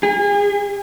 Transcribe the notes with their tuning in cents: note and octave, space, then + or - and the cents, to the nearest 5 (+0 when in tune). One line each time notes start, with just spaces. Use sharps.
G#4 -35